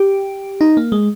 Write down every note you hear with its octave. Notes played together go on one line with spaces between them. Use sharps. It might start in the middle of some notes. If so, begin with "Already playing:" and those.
Already playing: G4
D#4
A#3
G#3